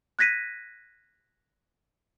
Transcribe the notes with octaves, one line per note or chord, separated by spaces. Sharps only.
F#6 G#6 A#6 B6 D#7